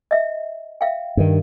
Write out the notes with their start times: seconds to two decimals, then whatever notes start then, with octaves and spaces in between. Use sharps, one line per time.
0.11 D#5 E5
0.81 E5 F5 G5
1.17 G2 D#3